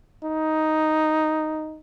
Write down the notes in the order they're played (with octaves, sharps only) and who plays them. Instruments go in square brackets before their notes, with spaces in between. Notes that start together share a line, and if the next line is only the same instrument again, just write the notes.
[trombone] D#4